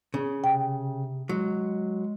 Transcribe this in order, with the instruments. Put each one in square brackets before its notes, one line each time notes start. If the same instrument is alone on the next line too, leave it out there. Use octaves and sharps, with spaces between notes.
[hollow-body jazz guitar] C#3
[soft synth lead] C3 [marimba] G5
[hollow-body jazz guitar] F#3 [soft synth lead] G#3